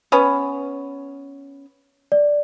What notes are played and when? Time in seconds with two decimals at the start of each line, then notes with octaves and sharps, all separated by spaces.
0.12 B3 C#4
2.12 D5